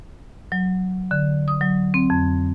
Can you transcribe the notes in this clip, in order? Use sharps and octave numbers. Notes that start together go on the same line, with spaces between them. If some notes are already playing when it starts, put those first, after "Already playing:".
F#3
D3
D#6
F#3
C4
F2